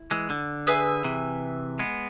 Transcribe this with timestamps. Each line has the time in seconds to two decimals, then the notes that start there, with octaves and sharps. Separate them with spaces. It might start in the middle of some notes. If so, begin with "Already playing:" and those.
Already playing: E4
0.11 E3 G#3
0.30 D3
0.67 G#4 B4 E5 G#5
1.04 C3 E3
1.79 G#3 B3